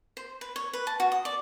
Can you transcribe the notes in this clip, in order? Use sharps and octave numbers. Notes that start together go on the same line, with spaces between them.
C5
B4
C#5
B4
A5
F#4
D#6
D5